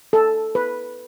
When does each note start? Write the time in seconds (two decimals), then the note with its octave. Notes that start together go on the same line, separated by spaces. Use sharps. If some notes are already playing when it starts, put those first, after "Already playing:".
0.13 A4
0.55 B4